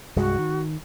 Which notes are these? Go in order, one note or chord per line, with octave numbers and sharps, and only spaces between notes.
C2 G2 G#3 F#4
D#3